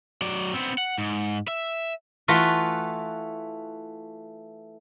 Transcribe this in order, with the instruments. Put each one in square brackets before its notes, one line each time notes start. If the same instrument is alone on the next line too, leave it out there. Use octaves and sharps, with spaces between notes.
[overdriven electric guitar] F#3 D5
B3 C4
F#5
G#2
E5
[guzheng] E3 A3 F4 F#4 B4